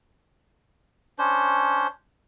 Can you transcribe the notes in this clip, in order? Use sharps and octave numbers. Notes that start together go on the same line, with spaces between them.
C#4 D4 C5